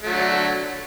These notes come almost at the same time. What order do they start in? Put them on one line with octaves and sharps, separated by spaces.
A3 F#3 D3